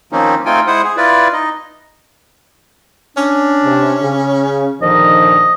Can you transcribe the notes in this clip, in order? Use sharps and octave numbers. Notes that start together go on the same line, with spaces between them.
D#3 F3 A#3 C4 C#4 D#4
A3 C4 D#4 F4 G5 G#5
G#3 E4 C5 F#5 D#6
G#4
E4 F4 B4 D5
D#4 D#5
C#4 D4
C3
C#3
A#1 D3 D#3 F3 D#5